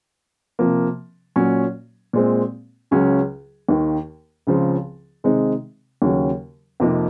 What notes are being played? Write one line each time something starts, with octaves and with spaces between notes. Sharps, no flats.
C3 F3 A#3
A#2 F#3 C#4
A#2 G#3 C4
C#2 C#3 F#3 C#4
D#2 D#3 A#3
C#2 C#3 F3 C4
C3 D#3 G#3 C4 D#4
D#2 C#3 F#3 C#4
F2 C3 F3 A#3 D#4